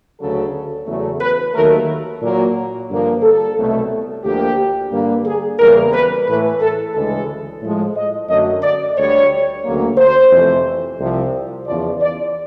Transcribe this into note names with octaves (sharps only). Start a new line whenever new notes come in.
D2 C#3 F#3 A4
E2 C#3 F#3 A3
B4
D#2 D#3 F#3 A3 A#4
A#2 F#3 A#3
G2 D3 F3 A#3
A4
C2 B2 F#3 A3
D2 D3 F3 A#3 G4
G2 D3 G3 A#3
G#4
E2 C#3 E3 G3 A#3 A#4
B4
A2 E3 A3 B4
A4
D2 C#3 E3 G#3 A4
A2 F3 G#3
D#5
F#2 D3 F#3 A3 D#5
D5
D2 D3 G3 C#5
D2 C#3 F#3 A#3
C5
F2 C3 E3 A3
C2 C3 F3
E2 C#3 F3 D5
D5